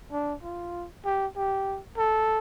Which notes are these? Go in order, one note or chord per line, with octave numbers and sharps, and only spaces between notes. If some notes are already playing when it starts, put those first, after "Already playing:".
D4
F4
G4
G4
A4